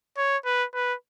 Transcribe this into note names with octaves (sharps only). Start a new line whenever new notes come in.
C#5
B4
B4